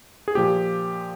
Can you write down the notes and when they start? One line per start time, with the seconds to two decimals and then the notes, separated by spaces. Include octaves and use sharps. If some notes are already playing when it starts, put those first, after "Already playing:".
0.28 G#4
0.35 A#2 F3 G4